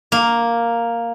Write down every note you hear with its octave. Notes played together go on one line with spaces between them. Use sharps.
A#3